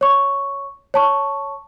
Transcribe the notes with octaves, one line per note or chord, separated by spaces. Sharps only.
C#5 C#6
C#5 A5 C#6